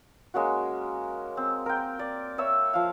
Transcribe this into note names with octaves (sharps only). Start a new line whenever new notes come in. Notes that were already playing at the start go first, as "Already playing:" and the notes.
G#3 A#3 C#4 F#4
C4
A#4 G5
D5
C#5 E5 E6
F3 F5